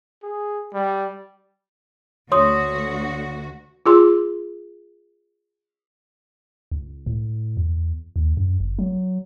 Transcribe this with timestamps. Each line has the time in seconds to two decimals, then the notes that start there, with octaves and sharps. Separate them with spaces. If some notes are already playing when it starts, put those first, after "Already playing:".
0.23 G#4
0.74 G3
2.32 D2 F#4 C#5 C6 D#6
3.86 F4 G#4 C6
6.72 C#2
7.06 A2
7.57 E2
8.16 D#2
8.37 F#2
8.60 G1
8.79 F#3